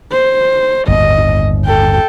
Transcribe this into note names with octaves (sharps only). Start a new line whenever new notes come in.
C5
G1 D#2 A2 D#5
A4 G5